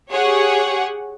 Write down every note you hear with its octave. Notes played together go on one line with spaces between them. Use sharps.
G4 G#4 C#5 F#5